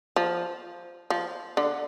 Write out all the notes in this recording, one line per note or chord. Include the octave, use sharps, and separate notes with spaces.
F3
F3
D3